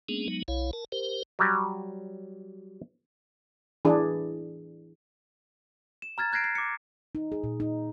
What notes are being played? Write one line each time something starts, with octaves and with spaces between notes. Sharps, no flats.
G#3 A#3 B3 C#4 D4 G#4
F#3 G#3 B3 D#4
B1 E4 C#5 F5
A#4 A5
G4 A#4 C5
F#3 G3
E3 D4 G#4
E7
A#5 F6 G#6 A6
F#6 G#6 A#6 C7 D7
C7
D6 C#7
D#4
G#4
A#2
D#4